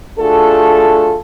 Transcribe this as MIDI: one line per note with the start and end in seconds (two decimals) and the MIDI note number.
0.19 1.17 57
0.19 1.17 62
0.19 1.17 65
0.19 1.17 66
0.19 1.17 68
0.19 1.17 69